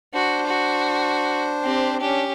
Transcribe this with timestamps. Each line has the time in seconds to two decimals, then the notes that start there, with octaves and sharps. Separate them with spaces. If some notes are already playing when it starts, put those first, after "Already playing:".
0.14 D4 F#4 C5
0.46 F#4
1.64 C4 G4
2.00 C#4 D4 G4